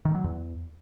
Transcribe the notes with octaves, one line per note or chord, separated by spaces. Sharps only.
D#3
F#3
E2